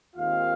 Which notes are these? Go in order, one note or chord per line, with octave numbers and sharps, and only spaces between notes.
D#2 D#3 G#3 C4 F4 F5